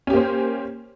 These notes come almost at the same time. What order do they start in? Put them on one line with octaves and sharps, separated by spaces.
C#4 G4 A#3 C5